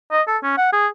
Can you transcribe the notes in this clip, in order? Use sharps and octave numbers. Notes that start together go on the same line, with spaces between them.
D#5
A4
C#4
F#5
G#4